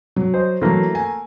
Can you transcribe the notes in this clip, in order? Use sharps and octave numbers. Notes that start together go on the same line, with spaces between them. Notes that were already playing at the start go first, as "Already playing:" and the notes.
F#3
C5 D#5
E3 F#3 A3 A#3
G#5